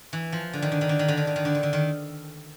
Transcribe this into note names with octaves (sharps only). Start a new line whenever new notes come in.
E3
F3
D3
D#3
D3
D#3
D3
D#3
D3
D#3
D3
D#3
D3
D#3
D3
D#3